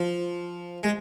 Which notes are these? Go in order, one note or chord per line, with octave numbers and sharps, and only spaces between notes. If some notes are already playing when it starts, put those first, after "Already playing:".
Already playing: F3
G#3